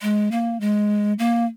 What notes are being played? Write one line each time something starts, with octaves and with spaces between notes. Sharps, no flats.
G#3
A#3
G#3
A#3